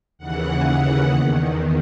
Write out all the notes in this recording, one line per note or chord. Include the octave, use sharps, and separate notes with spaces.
D#2 C#3 E3 F#5
E2 D#3